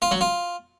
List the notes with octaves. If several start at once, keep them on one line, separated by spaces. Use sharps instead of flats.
F4
F#3
F4